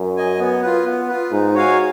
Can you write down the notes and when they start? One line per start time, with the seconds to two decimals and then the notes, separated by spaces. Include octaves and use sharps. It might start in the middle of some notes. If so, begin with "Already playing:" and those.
Already playing: F#2
0.17 D#5 G#5
0.39 B3
0.62 F4 B4
0.86 B3
1.08 F4 B4
1.32 G#2 D#4
1.55 F#4 C#5 F5 G#5